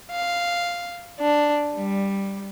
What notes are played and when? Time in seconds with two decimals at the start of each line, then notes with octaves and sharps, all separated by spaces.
0.10 F5
1.19 D4
1.74 G3